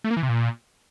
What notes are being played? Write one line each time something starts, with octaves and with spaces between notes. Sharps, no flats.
A3
A#3
E3
C3
A#2